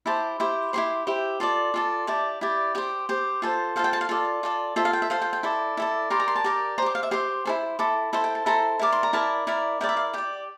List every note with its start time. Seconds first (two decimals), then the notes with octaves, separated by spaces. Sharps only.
0.06 E4 G4 C5 A5
0.40 E4 G4 C5
0.73 E4 G4 C5 C6
1.07 E4 G4 C5
1.40 F4 A4 D5
1.74 F4 A4 D5
2.07 E4 G4 D5 A5
2.41 E4 G4 D5
2.75 G4 C5 G5
3.09 G4 C5
3.42 F4 A4 C5
3.76 F4 A4 C5 F5
3.84 G5
3.93 A5
4.01 F5
4.09 F4 A4 D5
4.43 F4 A4 D5
4.76 F4 A4 C5 E5
4.85 F5
4.93 G5
5.02 E5
5.10 F4 A4 C5 F5
5.22 G5
5.33 G5
5.43 E4 A4 D5
5.77 E4 A4 D5
6.10 G4 A#4 D5 C6
6.20 A#5
6.28 C6
6.36 A5
6.44 G4 A#4 D5
6.78 C5 A#5
6.82 G4 D6
6.95 F5
7.03 E5
7.11 G4 C5 C6
7.45 E4 A4 C5
7.79 E4 A4 D6
8.13 E4 A4 C5
8.24 G5
8.35 A5
8.46 E4 A4 C5 A#5
8.79 E4 A#4 D5 D6
8.92 C6
9.03 A#5
9.13 E4 A#4 D5 A5
9.47 E4 A#4 D5
9.81 E4 A#4 D5 G5
9.89 E5
9.97 F5
10.13 G4 D5 G5